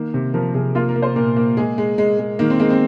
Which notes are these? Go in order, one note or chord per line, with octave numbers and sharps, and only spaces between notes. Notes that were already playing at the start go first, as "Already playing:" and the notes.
Already playing: D#3 A#3
C3
F3 A#4
C3 G#4
A#3 F4
A#4
A#3
C5
A#2 A#4
A#3
G#3 G#4
G#3
G#3
G#3
D#3 A#3
C4
G#3 A#3
C4